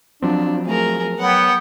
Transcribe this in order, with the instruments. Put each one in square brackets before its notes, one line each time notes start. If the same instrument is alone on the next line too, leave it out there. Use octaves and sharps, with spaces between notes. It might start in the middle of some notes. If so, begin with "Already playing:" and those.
[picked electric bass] F3 F#3 C4 [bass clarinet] D4
[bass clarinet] A3 [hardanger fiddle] G#4 A#4
[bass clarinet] F#3 [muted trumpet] B3 [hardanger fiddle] F#5 G5